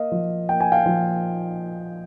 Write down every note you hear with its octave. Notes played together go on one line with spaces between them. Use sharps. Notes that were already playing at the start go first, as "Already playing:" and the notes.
Already playing: A#3 D#5 F5
F3
A#3 G5
G#5
F5 G5
F3